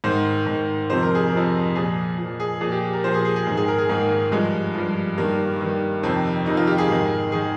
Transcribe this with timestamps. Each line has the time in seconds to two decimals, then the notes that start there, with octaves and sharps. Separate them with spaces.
0.04 G#2 D#3 C5
0.47 G#2 D#3
0.90 F2 C3 F3 C5
1.03 A#4
1.15 G#4
1.27 A#4
1.33 F2 C3 F3
1.75 A#2 F3 G#4
2.18 A#2 F3
2.40 G#4
2.61 A#2 F3 G#4
2.72 G4
2.93 A#4
3.04 A#2 F3 C5
3.14 G#4
3.25 G#4
3.36 G#4
3.47 G#2 D#3
3.57 G#4
3.68 A#4
3.78 G#4
3.89 G#2 D#3 A#3
4.32 G2 F3 G#3
4.75 G2 F3
5.18 G2 D#3 A#3
5.61 G2 D#3
6.03 F2 C3 D#3 C4
6.46 F2 C3 D#3 D#4
6.57 F4
6.67 G4
6.78 G#4
6.89 G#2 D#3
7.32 D#3 G#4